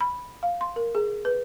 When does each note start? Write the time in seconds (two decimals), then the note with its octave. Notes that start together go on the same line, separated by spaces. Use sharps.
0.01 B5
0.43 F5
0.61 C6
0.76 A#4
0.95 G#4
1.25 B4